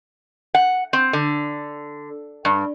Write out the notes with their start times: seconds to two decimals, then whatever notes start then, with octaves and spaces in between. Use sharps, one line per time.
0.55 F#5
0.93 C4
1.13 D3
2.45 G2